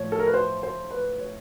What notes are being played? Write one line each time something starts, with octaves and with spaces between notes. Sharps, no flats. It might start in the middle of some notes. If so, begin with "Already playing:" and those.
Already playing: A2 F3 C#5
A4
A#4
B4
C5
C5
B4
C#5